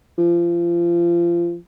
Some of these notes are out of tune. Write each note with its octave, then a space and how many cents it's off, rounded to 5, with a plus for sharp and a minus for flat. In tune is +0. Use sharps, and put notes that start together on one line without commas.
F3 -30